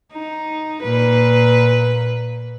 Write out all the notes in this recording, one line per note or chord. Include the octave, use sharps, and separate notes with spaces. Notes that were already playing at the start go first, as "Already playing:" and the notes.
D#4
A#2 B4